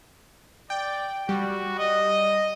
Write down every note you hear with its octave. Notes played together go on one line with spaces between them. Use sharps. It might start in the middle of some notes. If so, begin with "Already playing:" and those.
D5 G5
G3 F#4
D#5